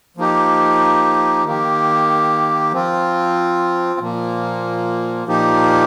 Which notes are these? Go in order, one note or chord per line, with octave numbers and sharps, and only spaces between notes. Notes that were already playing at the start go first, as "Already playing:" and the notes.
F3 A#3 D#4 G4
D#3 A#3 G4
F3 C4 F4
A#2 F3 A#3
A#2 F3 A#3 D#4 G4